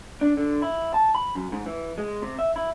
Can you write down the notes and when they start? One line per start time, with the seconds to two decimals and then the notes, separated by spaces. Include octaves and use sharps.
0.21 D4
0.37 D3
0.62 E4
0.94 A5
1.15 B5
1.35 F#2
1.52 G#2
1.66 E3
1.98 G#3
2.22 C3
2.39 E5
2.56 E4